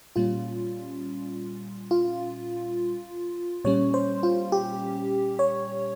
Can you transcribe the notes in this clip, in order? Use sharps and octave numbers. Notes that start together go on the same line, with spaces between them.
A#2 G3 C#4 F4
F4
A#2 G3 C#4 C#5
C5
F4
G4
C#5